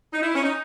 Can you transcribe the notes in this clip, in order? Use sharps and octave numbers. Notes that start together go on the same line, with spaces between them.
D#4
E4
C#4
D#4